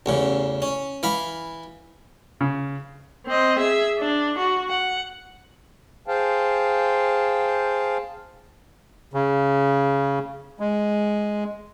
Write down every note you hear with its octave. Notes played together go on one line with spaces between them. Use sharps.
A1 E2 C#3
C#4
E3 F5 B5
C#3
C4 D#5
G#4 E5
D4
F#4
F#5
G#4 C5 F5 G5 A5
C#3
G#3